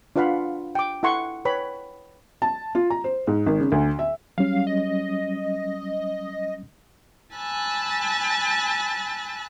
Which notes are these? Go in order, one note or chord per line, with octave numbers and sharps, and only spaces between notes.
D4 F4 B4 F5 F#5 B5
G5 D6
E4 A4 F#5 C6 C#6
B4 C#5 G5 B5
A5
F4
A#5
C5
G#2
G#1
C#3
D2
E5
F#3 G3 C#4 F5
D#5
G#5 A5 B5 E6 F#6 A6